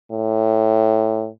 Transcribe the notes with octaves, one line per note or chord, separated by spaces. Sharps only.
A2